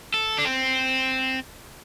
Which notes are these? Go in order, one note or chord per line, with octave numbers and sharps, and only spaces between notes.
A4
D4
C4